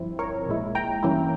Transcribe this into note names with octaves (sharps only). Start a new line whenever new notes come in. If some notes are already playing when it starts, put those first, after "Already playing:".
Already playing: G1 G2 F3 C4 E4
A#4 C#5
A#1 A#2 G#3 E4
G5 A#5
G2 E3 A#3 C#4 E4